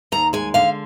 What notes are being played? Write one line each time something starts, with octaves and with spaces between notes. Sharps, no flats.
D#2 A#5
G#3 G#5
D3 F5